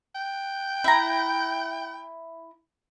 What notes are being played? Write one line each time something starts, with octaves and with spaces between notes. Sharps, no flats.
G5
E4 A#5